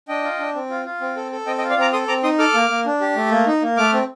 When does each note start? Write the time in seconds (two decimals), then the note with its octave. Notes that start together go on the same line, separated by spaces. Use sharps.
0.08 D4 D#5 G5
0.24 F4
0.39 D4
0.54 C4
0.70 F4
0.85 F4
1.01 C4
1.16 A4
1.31 A4
1.46 C4 D#5 G5
1.58 D#5 G5
1.62 F4
1.70 D5 F5
1.77 C4 A#5 D6
1.93 A4 C6 D#6
2.08 C4 A#5 D6
2.23 D#4 C6 D#6
2.39 A4 D6 F6
2.54 A#3
2.70 A#3
2.86 D4
3.01 G4
3.16 A3
3.31 A#3
3.47 D#4
3.62 A#3
3.77 A3 D6 F6
3.93 C4